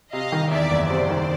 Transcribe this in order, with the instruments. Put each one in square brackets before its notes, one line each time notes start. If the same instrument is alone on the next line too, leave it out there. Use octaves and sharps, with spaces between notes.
[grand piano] C3 [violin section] D#5 F5
[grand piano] D#3
[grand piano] E2 [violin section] D5 E5
[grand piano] F#1
[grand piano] C3 [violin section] C5 D5
[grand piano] D#3